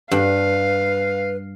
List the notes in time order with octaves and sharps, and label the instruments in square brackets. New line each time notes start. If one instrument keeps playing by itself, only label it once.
[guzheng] G2 [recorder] B4 [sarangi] F5